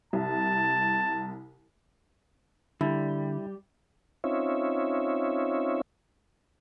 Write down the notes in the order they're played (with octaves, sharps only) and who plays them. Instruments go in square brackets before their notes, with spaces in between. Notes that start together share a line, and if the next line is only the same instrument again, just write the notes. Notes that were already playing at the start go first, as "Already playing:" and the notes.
[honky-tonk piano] C2 [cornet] A5
[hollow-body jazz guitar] D3 [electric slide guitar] G3 [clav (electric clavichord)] E4
[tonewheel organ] C4 C#4 D#4 F4 C#5 E5